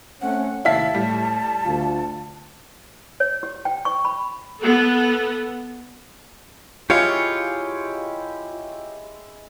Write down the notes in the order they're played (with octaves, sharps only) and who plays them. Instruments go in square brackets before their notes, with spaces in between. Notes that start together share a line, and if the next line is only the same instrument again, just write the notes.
[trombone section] A3 C4 C#4 [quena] F#5
[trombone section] D#2 A2 C3 [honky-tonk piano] E4 F5 B6 [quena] A5
[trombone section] A2 [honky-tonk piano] G3
[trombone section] D2 F4
[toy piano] C#5
G4
G5
C#6
B5
[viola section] B3 A4
[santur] G#3 E4 G#5 [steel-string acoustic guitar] F4 [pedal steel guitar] G4 C#5 F5